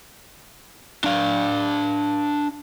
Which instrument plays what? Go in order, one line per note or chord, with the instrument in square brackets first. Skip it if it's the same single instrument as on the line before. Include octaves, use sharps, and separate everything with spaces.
[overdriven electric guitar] D4 F5